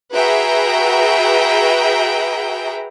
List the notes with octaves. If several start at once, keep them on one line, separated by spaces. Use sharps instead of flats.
F#4 G#4 B4 E5 G5 A#5